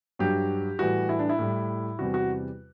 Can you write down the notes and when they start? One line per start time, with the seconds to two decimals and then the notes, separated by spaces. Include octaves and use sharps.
0.19 G2 F#3 G4
0.79 A2 E3 G3 F#4
1.09 E4
1.19 D4
1.29 E4
1.39 A2 G3
1.99 E2 C3 G3 F#4
2.14 F#4